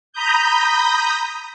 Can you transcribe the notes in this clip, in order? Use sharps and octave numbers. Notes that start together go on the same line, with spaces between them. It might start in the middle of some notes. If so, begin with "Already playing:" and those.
A#5 B5 D#6 G6